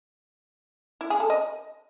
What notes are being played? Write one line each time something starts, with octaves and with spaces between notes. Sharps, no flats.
E4
G#4
A4
D#5